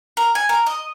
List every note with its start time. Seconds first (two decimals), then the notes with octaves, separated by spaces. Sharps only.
0.17 A#4
0.35 G#5
0.49 A#4
0.66 D#5